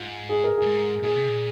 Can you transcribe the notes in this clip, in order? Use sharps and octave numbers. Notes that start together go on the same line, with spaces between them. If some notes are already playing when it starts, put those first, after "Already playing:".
Already playing: G#2 F4
G#4
A#4
G2 G#4
G#2
A#2 G#4
C3
A#2